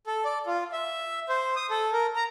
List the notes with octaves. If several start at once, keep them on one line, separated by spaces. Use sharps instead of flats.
A4
D5
F4
E5
C5
D#6
A4
A#4
A#5